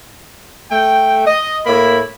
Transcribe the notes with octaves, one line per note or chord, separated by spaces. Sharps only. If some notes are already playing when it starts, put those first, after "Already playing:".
A3 G5
D#5
A2 A#3 E4 B5